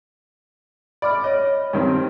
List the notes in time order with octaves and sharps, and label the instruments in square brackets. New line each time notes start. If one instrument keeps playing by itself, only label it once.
[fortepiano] D5 D6 [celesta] B5 F6
[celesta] C#5 [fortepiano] D#5
[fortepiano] G2 D#3 C4